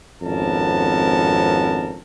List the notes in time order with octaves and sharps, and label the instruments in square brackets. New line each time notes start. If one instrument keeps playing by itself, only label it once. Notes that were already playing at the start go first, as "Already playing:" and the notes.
[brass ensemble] G#1 F2 B3 C#4 A#4 A5